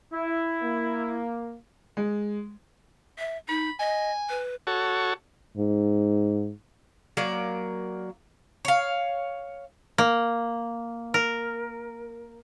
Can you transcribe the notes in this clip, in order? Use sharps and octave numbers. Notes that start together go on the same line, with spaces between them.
E4
A#3
G#3
E5
D#4 B5
D#5 G#5
B4
F#4 A4 C#5
G#2
F#3 A#3 D5
C#5 F5
A#3
A#4